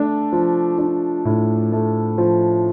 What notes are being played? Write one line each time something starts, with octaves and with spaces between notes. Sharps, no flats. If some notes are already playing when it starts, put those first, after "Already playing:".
Already playing: A3 D4
F3
D4
A2
A3
F3